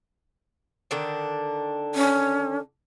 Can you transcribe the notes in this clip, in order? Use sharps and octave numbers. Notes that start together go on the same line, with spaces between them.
D3 D#3 D4
C#4